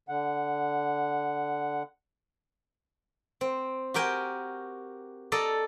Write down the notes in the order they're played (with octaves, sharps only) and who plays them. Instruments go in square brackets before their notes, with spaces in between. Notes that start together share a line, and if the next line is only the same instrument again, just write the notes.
[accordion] D3 F#5
[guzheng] C4
F#4 G4 A#4 G5 G#5
A4 D5 D#5 A#5